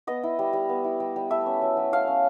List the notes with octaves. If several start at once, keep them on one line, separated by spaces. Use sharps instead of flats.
B3 D#5
E4
G3
G3
B3
E4
G3
G3
A3 E5
C#4
F#3
F#3
A3 F5
C#4